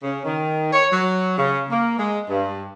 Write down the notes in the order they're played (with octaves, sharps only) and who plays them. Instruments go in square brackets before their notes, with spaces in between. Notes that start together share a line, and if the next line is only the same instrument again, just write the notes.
[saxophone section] C#3
D#3
C#5
F#3
C#3
A#3
G#3
G2